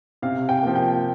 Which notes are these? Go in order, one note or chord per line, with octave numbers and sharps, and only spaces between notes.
C3 F5
G5
F3 A#3
G5